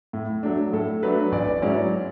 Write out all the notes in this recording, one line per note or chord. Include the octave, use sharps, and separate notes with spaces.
A2
F#3 A3 D4
A2 A4
F#3 A3 D4 B4
A1 D5
G#2 F#3 C#4 E4 D5